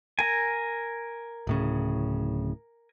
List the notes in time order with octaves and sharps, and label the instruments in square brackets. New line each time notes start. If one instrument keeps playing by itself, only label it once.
[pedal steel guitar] A#4 G#5
[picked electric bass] D1 A2 C#3